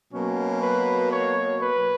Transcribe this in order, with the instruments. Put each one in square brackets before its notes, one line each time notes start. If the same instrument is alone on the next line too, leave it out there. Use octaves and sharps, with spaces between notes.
[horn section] B2 F#3 A#3 C#4
B4
C#5
B4